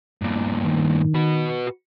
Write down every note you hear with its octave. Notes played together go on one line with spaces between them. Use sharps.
G2 A#2
D#3
F#4 B4